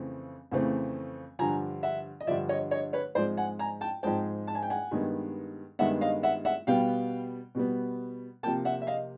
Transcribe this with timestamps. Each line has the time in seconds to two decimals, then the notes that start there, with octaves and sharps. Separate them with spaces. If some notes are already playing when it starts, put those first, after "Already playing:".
Already playing: F2 C#3 E3 A3 C4
0.52 F2 C#3 E3 A3 C4
1.39 G2 D3 F3 G#5 A#5
1.83 E5 F#5
2.20 D#5
2.27 G2 D3 F3 D5 E5
2.49 C#5 D#5
2.71 C#5 D#5
2.93 B4 C#5
3.15 G#2 F3 G#3 C4 C5 D5
3.37 F#5 G#5
3.59 G#5 A#5
3.81 G5 A5
4.03 G#2 F3 G#3 C4 G5 A5
4.47 A5
4.55 G#5
4.63 G5
4.70 F#5 G#5
4.91 G2 D#3 G#3 B3
5.79 G2 D#3 G#3 B3 E5 F#5
6.01 D#5 F5
6.23 E5 F#5
6.45 E5 F#5
6.67 B2 G3 B3 F5 G5
7.55 B2 G3 B3
8.43 C3 F3 A#3 G5 A5
8.65 E5 F#5
8.82 E5
8.87 D#5 F5